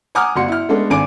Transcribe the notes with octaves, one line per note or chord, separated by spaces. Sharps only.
F#5 G#5 A#5 D6 D#6 F6
G1 F#4 C6 C#7
E4 F6
G#3 A3 B3 D4 A4
G#1 D4 G#5 D6 D7